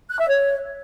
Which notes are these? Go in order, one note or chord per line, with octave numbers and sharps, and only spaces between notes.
F#6
E5
C#5